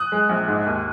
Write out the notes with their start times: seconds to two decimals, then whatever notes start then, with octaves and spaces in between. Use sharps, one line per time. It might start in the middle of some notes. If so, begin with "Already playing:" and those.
Already playing: D#6 F#6
0.12 G#3
0.29 A#1
0.48 G#2
0.66 D#2